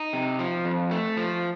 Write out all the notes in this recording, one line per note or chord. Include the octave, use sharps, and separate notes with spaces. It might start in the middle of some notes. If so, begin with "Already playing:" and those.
Already playing: D#4
C3
F3
F2
A3
F3